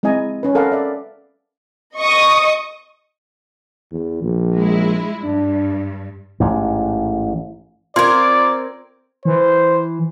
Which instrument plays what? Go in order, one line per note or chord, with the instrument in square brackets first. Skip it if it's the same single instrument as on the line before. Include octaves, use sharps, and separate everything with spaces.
[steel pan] G#3 C4 E4 D#5 G#5 A#5
C#4 B4
A4 A#4 F5 F#5 B5
D5 E5
[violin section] D#5 C#6 D#6
[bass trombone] E2
A#1
[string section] G#3 E4
[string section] G2 [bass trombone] D4
[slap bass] A1 G#2
[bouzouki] C4 A#4 [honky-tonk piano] F4 G#6 [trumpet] D5 [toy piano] C6
[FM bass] E3 [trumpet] C5